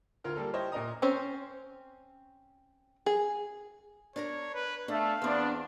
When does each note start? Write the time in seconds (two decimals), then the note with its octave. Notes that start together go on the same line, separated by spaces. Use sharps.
0.24 D2 F4 A#4 F6
0.36 G3 A#3 A4
0.53 E4 G4 C5 C#5 D#5
0.72 A#2 A#4 D#5 A#5 D#6
1.02 C4 C#4 C5
3.06 G#4
4.16 D4 A#4 C#5 A#5
4.54 B4
4.88 A3 D4 F5
5.22 E2 B3 C4 D4